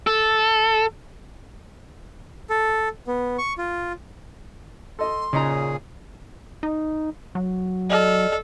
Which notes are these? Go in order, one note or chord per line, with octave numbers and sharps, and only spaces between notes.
A4
A4
B3
C#6
F4
A4 D#5 C6
A#2 C#3 C#4 D#4 G#4 A#5
D#4
F#3
A4 D5 D#5 F6